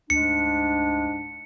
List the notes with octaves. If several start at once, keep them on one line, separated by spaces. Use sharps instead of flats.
D2 G#2 G#3 D4 C#7